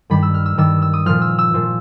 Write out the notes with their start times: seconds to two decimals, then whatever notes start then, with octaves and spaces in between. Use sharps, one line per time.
0.10 G2 D#3 G3 B5
0.23 E6
0.34 F6
0.46 E6
0.57 G2 D#3 G3 E6
0.82 E6
0.93 D#6
1.06 A#2 F3 F6
1.22 E6
1.39 E6
1.54 A#2 F3